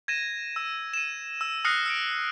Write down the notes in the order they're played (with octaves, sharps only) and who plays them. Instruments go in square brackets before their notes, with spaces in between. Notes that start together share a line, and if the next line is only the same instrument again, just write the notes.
[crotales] G#6 A#6 D#7 E7
E6
D#7 E7
E6
D#6 F6 F#6 A#6 C7 C#7
E6 C#7 D7